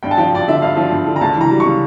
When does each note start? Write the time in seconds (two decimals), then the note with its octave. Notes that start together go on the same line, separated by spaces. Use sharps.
0.03 G2 G5
0.11 A5
0.17 F3 G5
0.33 G2 D5
0.48 D3 E5
0.62 G2 F5
0.77 F3
0.92 G2
1.07 D3
1.16 A#5
1.21 C#2 A5
1.36 E3 A#5
1.51 G3
1.60 C#3 C#6